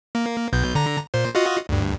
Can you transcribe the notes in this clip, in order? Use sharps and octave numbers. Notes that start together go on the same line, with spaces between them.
A#3
B1 B2 G6
D3 A#5
A#2 C5
F4 F#4 D#5
D2 G2